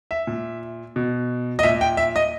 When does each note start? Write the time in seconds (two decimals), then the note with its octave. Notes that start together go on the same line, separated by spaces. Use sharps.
0.11 E5
0.27 A#2
0.96 B2
1.59 D#5
1.63 A#2 E5
1.81 G5
1.97 E5
2.16 D#5